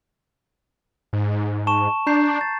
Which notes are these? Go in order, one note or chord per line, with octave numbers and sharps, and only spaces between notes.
G#2
A5 C#6 E7
D4 A#5 G6 C7
A6